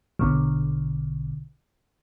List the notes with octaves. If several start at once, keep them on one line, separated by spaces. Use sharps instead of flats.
A#1 B2 D3